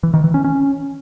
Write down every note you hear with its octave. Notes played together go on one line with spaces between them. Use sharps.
E3
D#3
E3
C#4
C#4